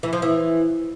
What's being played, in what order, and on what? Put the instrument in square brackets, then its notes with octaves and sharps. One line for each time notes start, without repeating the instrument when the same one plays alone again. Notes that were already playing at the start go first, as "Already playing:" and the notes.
[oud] E3
F3
E3